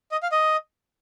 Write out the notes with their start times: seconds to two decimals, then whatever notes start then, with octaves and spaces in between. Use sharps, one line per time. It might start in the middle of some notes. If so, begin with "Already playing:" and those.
0.12 D#5
0.23 F5
0.32 D#5